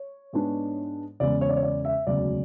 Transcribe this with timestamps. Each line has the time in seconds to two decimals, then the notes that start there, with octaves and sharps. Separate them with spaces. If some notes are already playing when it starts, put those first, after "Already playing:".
Already playing: C#5
0.33 G#2 G#3 B3 D4
1.20 E2 C#3 G#3 D5
1.41 C#5
1.49 D5
1.56 C#5
1.63 D5
1.85 E5
2.07 E1 D2 C#3 F#3 D5